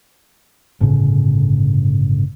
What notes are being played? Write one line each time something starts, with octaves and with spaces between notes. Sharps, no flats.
G1 A2 C#3